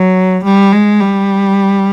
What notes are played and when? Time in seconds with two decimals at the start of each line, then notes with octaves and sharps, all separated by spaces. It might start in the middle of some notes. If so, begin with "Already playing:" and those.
Already playing: F#3
0.45 G3
0.72 G#3
1.01 G3